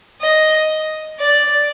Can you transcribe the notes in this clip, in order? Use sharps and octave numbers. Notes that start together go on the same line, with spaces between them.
D#5
D5